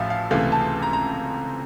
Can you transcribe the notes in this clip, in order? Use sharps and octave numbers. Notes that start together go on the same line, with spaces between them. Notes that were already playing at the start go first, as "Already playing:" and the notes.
Already playing: A1 A2 F3 E5 F5
F5
C#2 C3 E3 A3 F5
A5
A#5
A#5